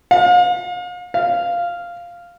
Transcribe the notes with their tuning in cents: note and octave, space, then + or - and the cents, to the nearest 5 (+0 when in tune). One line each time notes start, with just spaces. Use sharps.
F5 +40
F5 -5